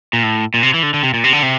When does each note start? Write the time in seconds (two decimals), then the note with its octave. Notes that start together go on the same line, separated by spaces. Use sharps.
0.13 A#2
0.23 A2
0.54 A#2
0.63 C3
0.74 E3
0.83 D3
0.94 D3
1.03 C3
1.14 A#2
1.24 C3
1.33 D3
1.42 C3